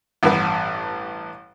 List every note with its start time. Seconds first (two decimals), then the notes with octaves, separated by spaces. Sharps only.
0.23 A1 G2 B3 B4